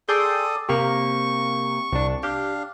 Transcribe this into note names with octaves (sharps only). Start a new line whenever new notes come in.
G#4 A4 D5 G5 C6 D#6
C3 A#3 G4 C#6
C2 D4
D4 G4 F5